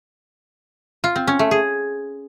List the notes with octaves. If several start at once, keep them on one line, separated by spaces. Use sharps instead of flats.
F4
C4
C#4
A3
G#4